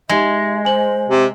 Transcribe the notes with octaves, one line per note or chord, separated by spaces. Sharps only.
G#3 D#4 G4 E5
C5 G#5 F#7
C3